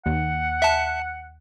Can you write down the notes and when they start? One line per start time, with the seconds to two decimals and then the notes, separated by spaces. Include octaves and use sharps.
0.06 D#2 F#5
0.62 E5 A5